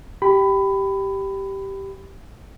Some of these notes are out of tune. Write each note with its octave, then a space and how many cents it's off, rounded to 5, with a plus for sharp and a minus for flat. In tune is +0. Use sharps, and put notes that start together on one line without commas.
G4 -10 B5 +20